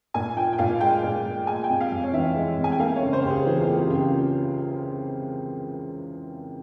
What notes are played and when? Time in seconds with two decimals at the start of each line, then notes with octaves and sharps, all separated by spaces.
0.14 A#2 G#5
0.37 F3 G5
0.53 G5
0.59 A#2 F5
0.81 G#3 G5
1.03 A#2
1.25 F3
1.47 G#3 G#5
1.64 G5
1.70 C3
1.81 F5
1.91 F2
2.03 C#5
2.14 E3 E5
2.35 G#3
2.58 C3
2.64 G#5
2.72 G5
2.79 A#3 F5
2.96 C#5
3.02 C#3
3.13 C5
3.22 C#2 G4
3.29 G#4
3.46 E3 F4
3.62 G4
3.68 A#3
3.79 G4
3.90 C#3 F4
3.95 G4